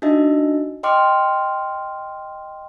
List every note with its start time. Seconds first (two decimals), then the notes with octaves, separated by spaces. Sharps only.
0.02 D4 D#4 F#4 D#5 E5
0.83 D#5 G5 C6 D6 F6